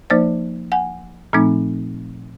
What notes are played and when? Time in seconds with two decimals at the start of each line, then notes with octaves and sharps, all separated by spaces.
0.10 F3 A#3 D#4 C5 D5
0.72 F#5 G#5
1.33 A#2 F3 A3 C4 D#4